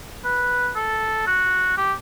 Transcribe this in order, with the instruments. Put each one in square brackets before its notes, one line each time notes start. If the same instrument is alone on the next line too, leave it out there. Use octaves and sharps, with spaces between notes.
[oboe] B4
A4
F#4
G4